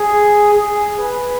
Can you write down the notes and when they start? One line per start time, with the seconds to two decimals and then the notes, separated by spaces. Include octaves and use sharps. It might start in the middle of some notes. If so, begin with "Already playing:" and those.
Already playing: G#4
0.54 G#4
0.98 B4